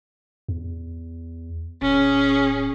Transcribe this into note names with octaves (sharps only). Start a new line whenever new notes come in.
E2
D1 C#4 G#4